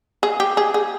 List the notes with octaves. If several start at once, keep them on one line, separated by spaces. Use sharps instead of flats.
G#4
G4
G#4
G#4